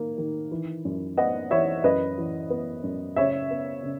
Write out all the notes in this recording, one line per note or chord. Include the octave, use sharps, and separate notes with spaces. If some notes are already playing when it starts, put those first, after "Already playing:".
Already playing: D#3 A#3
D#3
E3
F#2
B3 D#5 F#5
E3 C#5 E5
F#2 B4 D#5
E3
B3
F#2
C#3 C#5 E5
B3
C#3